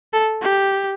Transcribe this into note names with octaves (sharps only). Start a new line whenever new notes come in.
A4
G4